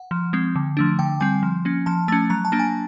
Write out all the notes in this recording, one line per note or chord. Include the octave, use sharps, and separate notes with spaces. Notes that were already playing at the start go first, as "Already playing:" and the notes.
Already playing: F#5
F3
G#3 C4
D3
F3 A3 D4
D3 G5
G3 C4 G#5
F3
A#3 C#4
F3 A5
A3 C#4 A5
F#3 A#5
A5
A#3 D4
G#5